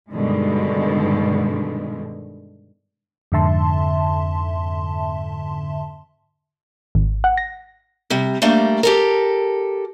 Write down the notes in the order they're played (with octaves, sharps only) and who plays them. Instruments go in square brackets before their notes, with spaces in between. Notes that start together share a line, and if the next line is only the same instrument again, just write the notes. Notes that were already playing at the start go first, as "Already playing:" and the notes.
[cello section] G2 B2 D3 D#3 G#3
[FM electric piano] F2 G#2 D3 E5 A5 C6
[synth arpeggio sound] G#1
F#5
A#6
[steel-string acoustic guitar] C3 G3
G3 A3 A#3 D4
G4 A4 A#4